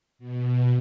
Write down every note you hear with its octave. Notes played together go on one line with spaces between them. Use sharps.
B2